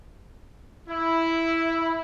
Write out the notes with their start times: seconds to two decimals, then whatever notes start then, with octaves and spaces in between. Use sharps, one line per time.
0.89 E4